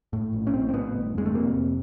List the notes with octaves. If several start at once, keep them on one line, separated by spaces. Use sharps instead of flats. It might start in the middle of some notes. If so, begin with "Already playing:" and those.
A2
A#1
C#4
A2 C4
C4
A2 B3
G1
F2 G#3
A3
C3 A#3
F2